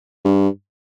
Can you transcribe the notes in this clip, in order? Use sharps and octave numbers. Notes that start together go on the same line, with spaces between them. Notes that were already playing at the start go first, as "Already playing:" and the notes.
G2